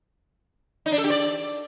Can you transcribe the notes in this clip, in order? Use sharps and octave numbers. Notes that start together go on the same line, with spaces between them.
D#4
D4
A4
G4
D5